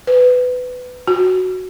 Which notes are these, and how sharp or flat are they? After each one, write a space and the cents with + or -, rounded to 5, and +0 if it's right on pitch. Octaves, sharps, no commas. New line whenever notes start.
B4 +20
F#4 +0